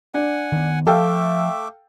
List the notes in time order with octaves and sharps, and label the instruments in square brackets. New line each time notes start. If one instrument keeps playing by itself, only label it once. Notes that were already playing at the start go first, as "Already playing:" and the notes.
[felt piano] D4 [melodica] F#5 G#5
[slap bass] D#3 B3
[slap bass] F3 [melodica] A3 E5 D6 [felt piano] A4 F5 G5